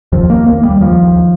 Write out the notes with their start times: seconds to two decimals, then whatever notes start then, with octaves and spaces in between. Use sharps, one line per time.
0.12 D#2 F3
0.30 A#3
0.35 D#2
0.47 A#3
0.58 D#2
0.63 G3
0.80 D#2 F3
1.03 D#2